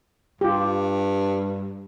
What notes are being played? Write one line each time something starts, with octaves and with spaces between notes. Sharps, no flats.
G2 F4 G4